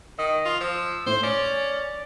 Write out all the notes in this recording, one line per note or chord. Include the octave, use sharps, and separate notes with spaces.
D#3 D#5
F4
F3 E6
A2 C5
C#4 D5